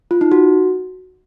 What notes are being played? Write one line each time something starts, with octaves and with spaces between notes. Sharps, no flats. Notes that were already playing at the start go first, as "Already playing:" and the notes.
F4
D#4
F#4